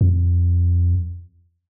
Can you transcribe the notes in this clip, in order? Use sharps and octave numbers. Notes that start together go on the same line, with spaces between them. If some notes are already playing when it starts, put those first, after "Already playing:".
F2